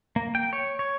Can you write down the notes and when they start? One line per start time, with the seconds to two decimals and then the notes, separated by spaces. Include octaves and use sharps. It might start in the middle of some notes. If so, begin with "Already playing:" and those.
0.16 A#3
0.35 G5
0.53 C#5
0.79 C#5